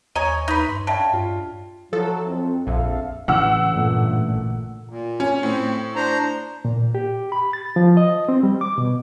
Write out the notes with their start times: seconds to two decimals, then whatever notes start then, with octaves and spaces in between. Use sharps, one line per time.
0.15 D#2 C#5 D#5 G#5 A#5
0.48 D#4 B4
0.69 G2 C6
0.87 C#3 D5 E5 G5 A5
1.13 G2 F4
1.93 F3 F#3 E4 A4
2.26 F2 C4
2.67 A#1 F2 A4 E5 F5
3.28 A1 C#3 E3 F#5 E6
3.70 G2 A#2 A3
4.89 A#2
5.20 C#4
5.43 A2 C4
5.96 D4 C5 A#5
6.65 A#2
6.95 G4
7.32 B5
7.53 A6
7.76 F3
7.97 D#5
8.29 C4
8.43 G3
8.61 D6
8.78 B2